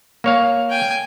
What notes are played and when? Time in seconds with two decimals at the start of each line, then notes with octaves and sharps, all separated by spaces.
0.24 A#3 C#5 F5
0.70 G5 G#5